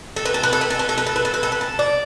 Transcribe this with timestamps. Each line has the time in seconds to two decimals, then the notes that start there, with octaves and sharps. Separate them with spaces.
0.16 A4
0.25 B4
0.34 A4
0.43 B4
0.53 A4
0.61 B4
0.70 A4
0.79 B4
0.89 A4
0.98 B4
1.06 A4
1.16 B4
1.25 A4
1.34 B4
1.43 A4
1.52 B4
1.61 A4
1.79 D5